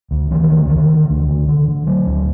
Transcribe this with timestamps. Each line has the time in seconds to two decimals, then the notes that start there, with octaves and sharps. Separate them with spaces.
0.11 D2
0.30 D2 E3
0.43 D#3
0.50 D2
0.56 D3
0.68 D3 D#3
0.89 D3
1.09 D2
1.28 D3
1.48 D3
1.68 D3
1.87 D3 F#3
2.06 D2